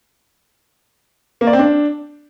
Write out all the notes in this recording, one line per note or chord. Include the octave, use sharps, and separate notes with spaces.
A#3
D5
C4
D4